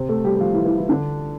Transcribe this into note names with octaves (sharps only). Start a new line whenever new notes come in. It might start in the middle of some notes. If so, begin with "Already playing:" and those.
Already playing: C3 C4
A3 A4
G3 G4
G4
F3 F4
E3 E4
E3 E4
E3 E4
D3 D4